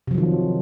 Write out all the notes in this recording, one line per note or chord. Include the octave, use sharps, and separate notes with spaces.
C3 D#3 F3 F#3